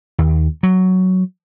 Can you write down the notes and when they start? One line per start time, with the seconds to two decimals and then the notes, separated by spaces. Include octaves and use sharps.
0.18 D#2
0.63 F#3